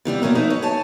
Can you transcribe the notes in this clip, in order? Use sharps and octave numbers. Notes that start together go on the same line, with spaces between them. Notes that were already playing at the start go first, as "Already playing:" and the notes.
C3 E3 G3 B3
F#2 B2 A#3 C#4 F4
F3 D#4 B4 E5
C#5
C#5 G#5 A5